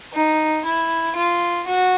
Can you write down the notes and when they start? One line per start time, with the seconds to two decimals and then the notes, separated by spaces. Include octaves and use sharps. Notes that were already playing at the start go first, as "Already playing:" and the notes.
0.13 D#4
0.65 E4
1.15 F4
1.67 F#4